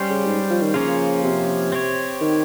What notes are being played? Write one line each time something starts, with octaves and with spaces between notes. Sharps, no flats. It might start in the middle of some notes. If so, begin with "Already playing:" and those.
Already playing: G3 C#4 G4 C5
C#3
G#2
F3
D#3
C#3 F3 A#3 C#4 F4
C3
C4 G4 C#5
D#3